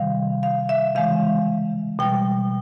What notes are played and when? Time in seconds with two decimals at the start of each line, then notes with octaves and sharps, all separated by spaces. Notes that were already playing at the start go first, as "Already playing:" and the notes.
Already playing: C3 D#3 G3 F5
0.43 F5
0.69 E5
0.95 C#3 E3 G#3 F5
1.99 B2 G3 G5